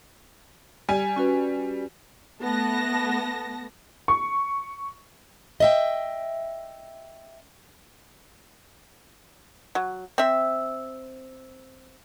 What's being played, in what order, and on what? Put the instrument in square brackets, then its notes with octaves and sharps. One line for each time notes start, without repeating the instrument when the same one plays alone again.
[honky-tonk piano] G3 G#5
[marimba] C#4 F#4 B4
[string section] A3 B3 A5 A#6
[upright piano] C#6
[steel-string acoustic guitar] D#5 E5 G5
[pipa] F#3
C4 E5